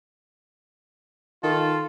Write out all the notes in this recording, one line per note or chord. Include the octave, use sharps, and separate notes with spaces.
D#3 F4 A4